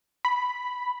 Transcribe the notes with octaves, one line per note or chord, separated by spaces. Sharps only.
B5